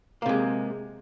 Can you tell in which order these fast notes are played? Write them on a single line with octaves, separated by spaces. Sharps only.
A#3 C3 G#3